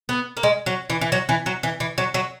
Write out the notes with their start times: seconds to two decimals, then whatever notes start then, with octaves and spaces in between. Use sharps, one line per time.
0.09 B3
0.37 A#3
0.43 G#3
0.66 F#3
0.90 E3
1.01 E3
1.12 F#3
1.29 E3
1.46 F#3
1.63 E3
1.80 E3
1.98 F#3
2.14 F#3